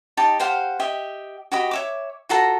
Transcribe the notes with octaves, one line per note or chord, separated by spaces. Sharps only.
D#4 G4 A5
G4 C5 F5 F#5
G4 D#5 E5
F#4 G4 D#5 B5
C#5 E5 D6
F4 F#4 A4 A#5